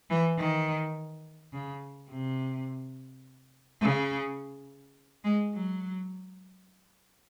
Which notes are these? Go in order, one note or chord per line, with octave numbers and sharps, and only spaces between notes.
E3
D#3
C#3
C3
C#3
G#3
F#3